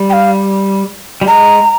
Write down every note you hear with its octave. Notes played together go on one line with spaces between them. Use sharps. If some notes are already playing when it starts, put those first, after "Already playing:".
Already playing: G3
G5
F5
G3
G#3 A#5